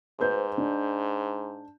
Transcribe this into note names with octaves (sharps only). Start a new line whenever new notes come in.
G#2 B4 C5 G6
D4